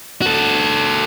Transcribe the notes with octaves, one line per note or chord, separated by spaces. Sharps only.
F#4 A4